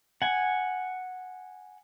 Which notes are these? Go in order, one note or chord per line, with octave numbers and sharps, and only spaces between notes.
F#5 G#5